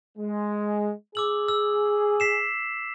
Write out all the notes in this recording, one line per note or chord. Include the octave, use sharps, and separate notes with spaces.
G#3
G#4 D6 E6 F#7
E6
B6 C7 E7